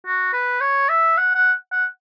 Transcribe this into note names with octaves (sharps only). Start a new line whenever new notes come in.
F#4
B4
C#5
E5
F#5
F#5
F#5